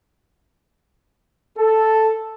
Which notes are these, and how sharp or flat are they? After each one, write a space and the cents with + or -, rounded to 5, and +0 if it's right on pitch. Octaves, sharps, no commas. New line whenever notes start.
A4 +0